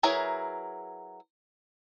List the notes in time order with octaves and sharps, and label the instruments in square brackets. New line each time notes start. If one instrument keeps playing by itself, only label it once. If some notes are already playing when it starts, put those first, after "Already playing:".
[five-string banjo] F#3 E4 G#4 A#4 B4